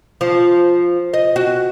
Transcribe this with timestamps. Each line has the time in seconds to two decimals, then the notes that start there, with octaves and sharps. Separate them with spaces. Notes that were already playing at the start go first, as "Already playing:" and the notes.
0.21 F3
1.14 D#5
1.36 F#4